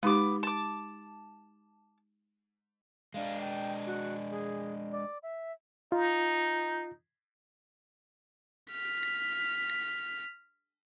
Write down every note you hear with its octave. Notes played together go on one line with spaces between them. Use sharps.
G#3 B3 D#4 G4 D6
A5 D6
G#3 D4 F5
G5
F#4
G#4
D5
E5
D#4 F4
F6 B6